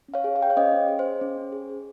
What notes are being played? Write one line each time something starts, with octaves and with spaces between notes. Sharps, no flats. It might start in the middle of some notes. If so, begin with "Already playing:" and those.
C#4
C#5 F5
G#4
F5
G#4 G5
C#5 F5
C#4 C5 D#5
C#4
G#4
C5
G#4
C#4
C#4
G#4
G#4